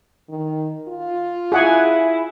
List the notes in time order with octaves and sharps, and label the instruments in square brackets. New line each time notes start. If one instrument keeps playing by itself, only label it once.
[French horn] D#3
F4
[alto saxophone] E4 [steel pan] G#4 F#5 G#5